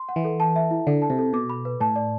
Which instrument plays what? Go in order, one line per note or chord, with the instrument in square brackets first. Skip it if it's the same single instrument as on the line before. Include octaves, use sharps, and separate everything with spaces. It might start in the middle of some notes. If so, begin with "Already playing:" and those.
Already playing: [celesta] C6
F#5
[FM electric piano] E3
[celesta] A4
A5
E5
E4
[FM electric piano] D3 [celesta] A4
[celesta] A5
[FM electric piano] C3
[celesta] A4
[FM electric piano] B2 [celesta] D6
[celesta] B5
B4
[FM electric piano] A2 [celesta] A5
[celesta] D5